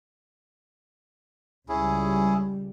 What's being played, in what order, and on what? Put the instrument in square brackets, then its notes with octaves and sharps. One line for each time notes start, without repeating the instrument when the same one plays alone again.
[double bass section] C#2 G3 [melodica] C#4 E4 G#4